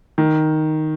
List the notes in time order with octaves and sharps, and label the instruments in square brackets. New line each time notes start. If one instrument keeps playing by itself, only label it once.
[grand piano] D#3